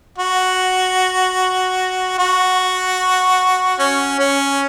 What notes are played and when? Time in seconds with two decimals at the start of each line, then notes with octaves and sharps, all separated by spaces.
0.18 F#4
2.19 F#4
3.79 C#4
4.19 C#4